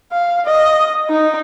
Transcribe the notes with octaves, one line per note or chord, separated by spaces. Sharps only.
F5
D#5
D#4